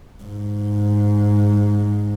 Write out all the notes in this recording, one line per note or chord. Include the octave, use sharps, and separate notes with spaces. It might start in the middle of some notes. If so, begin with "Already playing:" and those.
G#2